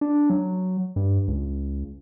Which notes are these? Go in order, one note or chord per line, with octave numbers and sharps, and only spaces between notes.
D4
F#3
G2
C#2